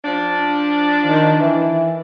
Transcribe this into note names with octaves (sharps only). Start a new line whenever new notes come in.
F3 D4
D#3
E3